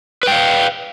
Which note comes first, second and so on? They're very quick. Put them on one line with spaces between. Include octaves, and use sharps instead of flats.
B4 G5 F5